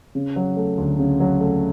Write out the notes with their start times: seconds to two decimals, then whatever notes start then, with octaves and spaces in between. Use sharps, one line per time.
0.15 C#3
0.36 F#3
0.57 A3
0.78 D2
0.99 C#3
1.20 F#3
1.41 A3